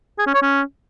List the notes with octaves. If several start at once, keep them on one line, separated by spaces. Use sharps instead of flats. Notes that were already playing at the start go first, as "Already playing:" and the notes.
G#4
C#4
C#5
C#4